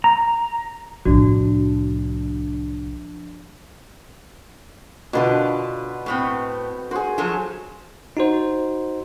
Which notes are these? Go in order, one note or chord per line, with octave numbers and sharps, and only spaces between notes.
A#5
C2 A2 F3 D4 F#4
B2 D3 F4 B4 A5
A2 B3 C4
F#4 G#4 C5
F3 F#3 A4
D#4 F#4 C5